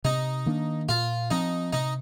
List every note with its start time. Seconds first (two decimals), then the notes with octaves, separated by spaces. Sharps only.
0.04 C3 D#4
0.46 D#3 A#3 D4
0.89 A#2 F4
1.31 F3 C4 D#4
1.73 C3 D#4